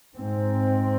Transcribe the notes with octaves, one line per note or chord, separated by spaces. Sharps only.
G#2 C4